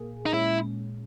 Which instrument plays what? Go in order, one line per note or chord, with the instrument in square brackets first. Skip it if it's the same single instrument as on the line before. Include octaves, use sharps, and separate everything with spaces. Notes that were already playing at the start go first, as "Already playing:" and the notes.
Already playing: [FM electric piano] A#2 A#3 G#4
[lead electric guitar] D#4
[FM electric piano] A#2 G#3 C#4 [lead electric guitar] E4